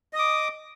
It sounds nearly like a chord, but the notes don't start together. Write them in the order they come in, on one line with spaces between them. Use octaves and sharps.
D#5 D#6 D6